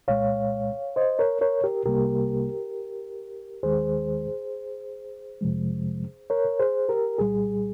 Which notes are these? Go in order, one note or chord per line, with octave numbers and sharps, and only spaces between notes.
C2 A#2 G#3 C#5 F5
C5 D#5
A#4 C#5
A#4 C#5
G4 A#4
C2 C3 G3 A#3 G4 A#4
D#2 D#3 G#3 G#4 C5
F2 C3 F3 G#3
A#4 C#5
G#4 C5
G4 A#4
C2 A#2 G3 G#4